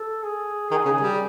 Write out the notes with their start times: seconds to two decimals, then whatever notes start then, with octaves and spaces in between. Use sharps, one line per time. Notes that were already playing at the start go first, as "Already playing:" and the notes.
Already playing: A4
0.23 G#4
0.71 D#3 G#4
0.85 C#3
1.01 G3